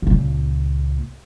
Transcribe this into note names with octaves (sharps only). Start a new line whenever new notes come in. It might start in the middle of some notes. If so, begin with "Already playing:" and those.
C#2 A#2